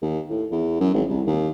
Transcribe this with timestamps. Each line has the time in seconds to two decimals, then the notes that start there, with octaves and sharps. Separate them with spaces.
0.02 D#2
0.30 A2
0.52 E2
0.80 F#2
0.94 G#1
1.09 C2
1.26 D#2